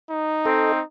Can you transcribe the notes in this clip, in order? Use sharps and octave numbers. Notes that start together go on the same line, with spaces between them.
D#4
C4 A4 D#5